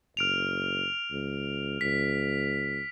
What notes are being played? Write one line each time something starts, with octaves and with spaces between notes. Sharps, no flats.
F#1 F6 D7 F7
C#2
C#2 B6